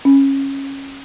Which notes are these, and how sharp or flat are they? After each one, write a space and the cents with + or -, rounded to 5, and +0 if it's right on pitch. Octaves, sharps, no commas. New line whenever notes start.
C#4 -20